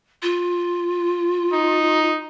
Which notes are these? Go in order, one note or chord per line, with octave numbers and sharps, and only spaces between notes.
F4
D#4